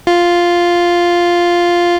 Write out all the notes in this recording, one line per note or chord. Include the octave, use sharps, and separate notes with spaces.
F4